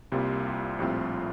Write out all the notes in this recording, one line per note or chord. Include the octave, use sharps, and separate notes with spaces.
C2 C3 G3 A#3 F4
A#1 A2 G3 C4 F4